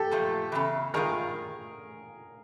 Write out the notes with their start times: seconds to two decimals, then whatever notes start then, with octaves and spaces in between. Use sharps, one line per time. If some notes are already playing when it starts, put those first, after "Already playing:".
Already playing: G4 A4
0.11 A#2 F3 A3
0.52 E2 C#3 E3
0.94 G2 D#3 G#3 F4 G#4 A#4